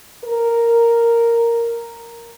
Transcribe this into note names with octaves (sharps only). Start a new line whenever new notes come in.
A#4